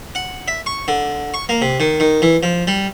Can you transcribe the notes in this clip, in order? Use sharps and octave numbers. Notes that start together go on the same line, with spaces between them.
F#5
E5
C#6
D3
C#6
A#3
C3
D#3
D#3
E3
F3
G3